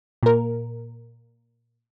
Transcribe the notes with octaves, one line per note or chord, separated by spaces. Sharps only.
A#2 A#4